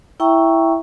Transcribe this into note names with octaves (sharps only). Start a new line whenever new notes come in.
E4 E5 G5 A#5 C#6